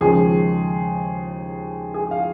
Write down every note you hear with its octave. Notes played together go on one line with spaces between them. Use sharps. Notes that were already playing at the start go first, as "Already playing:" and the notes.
D#2 C#3 F3 G#3 G#4
G#4
F5